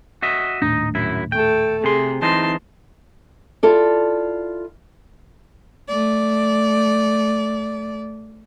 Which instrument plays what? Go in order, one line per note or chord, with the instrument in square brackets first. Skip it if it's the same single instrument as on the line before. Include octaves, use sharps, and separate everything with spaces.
[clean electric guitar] F#4 D#5 E5
[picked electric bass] D#1 A2 D4 [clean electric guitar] D#4
[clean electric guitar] F#2 E4
[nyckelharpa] A3 A4 [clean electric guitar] G5
[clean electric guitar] C3 C6 [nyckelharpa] G#4
[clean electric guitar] E3 C4 D#4 [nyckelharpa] A5 C6
[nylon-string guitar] E4 F4 A4 D5
[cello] A3 D5